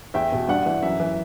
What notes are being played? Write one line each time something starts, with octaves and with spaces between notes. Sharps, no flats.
E2 E5 G5
B2
G2 D5 F#5
E3
F#2 E5
E3